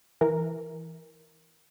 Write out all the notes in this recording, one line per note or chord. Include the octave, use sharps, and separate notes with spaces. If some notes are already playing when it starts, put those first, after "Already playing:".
E3 A#4